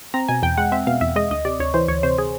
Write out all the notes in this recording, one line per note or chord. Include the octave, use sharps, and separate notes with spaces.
C4 A#5
B2 G#5
E2 G5
G#3 F#5
C4 E5
B2 F5
E2 E5
G#3 D#5
D2 D#5
C3 D5
D2 C#5
E3 C5
D2 C#5
C3 C5
G#4